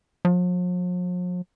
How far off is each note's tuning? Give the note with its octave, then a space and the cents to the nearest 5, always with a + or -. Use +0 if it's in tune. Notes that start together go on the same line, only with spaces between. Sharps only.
F3 +45